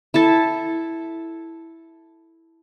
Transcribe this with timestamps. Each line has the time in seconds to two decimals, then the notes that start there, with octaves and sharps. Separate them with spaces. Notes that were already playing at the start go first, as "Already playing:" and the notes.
0.14 E4 A4 A5